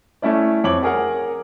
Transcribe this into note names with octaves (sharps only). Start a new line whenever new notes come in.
A3 C#4 E4 D5
F2 C#5 D6 F#7
G#4 A#4 F#5